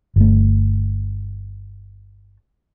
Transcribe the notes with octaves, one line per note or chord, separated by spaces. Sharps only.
G1 A3